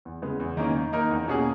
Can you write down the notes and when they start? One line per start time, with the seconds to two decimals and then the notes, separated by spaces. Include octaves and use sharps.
0.05 E2
0.22 C#3 G#3 B3
0.40 E2
0.57 D#3 A#3 C#4
0.75 D#3
0.93 A#3 D#4 A#4
1.10 E2
1.28 B2 A#3 C#4 G#4